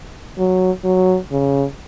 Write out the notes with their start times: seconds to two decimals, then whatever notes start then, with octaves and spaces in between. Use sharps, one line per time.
0.38 F#3
0.84 F#3
1.32 C#3